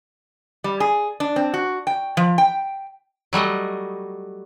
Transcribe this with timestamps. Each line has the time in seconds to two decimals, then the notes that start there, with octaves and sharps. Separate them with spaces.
0.64 G3
0.80 G#4
1.20 D4
1.36 C4
1.54 F#4
1.87 G5
2.17 F3
2.38 G5
3.33 F#3 G3 A3 D#5